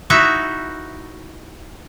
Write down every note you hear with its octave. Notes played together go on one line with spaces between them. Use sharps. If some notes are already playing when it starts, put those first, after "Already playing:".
D#4 E4 F#4 E5